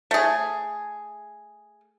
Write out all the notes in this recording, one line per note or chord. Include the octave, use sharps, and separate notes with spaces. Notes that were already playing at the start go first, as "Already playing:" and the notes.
A3 G#4